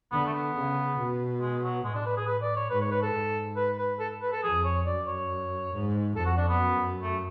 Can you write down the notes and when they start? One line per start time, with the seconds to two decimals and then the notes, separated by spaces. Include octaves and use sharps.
0.12 D3 B3
0.26 A3
0.33 B3
0.55 C#3
0.98 B2
1.41 G#3
1.63 F#3
1.84 A2 G#3
1.95 D4
2.06 B4
2.17 G#4
2.27 B4
2.42 D5
2.56 C#5
2.70 G#2 B4
2.81 C#5
2.91 B4
3.02 A4
3.13 G#2
3.56 B4
3.78 B4
3.99 A4
4.22 B4
4.32 A4
4.43 F2 G#4
4.65 C#5
4.86 F#2 D5
5.07 C#5
5.73 G#2
6.16 F2 A4
6.26 F#4
6.37 D4
6.49 B3
6.58 F#2
7.02 A3